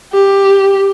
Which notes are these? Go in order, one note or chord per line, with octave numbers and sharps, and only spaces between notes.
G4